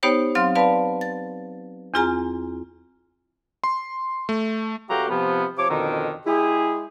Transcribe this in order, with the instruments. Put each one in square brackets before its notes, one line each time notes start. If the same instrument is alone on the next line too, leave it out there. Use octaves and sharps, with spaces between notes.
[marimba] B3 D#4 G4 C5 C#5 G5
F#3 C4 F5 C6 F6
B4 D5 F5 A5 B5
A6
E2 C4 F4 G#4 G#5 A#5
[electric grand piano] C6
A3
[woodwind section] C#2 A3 F#4 G4 F5 A#5
C3 F3 B3
C3 F3 C#5 D6
F2 B2 D3 D#3
G#3 E4 G4 G#4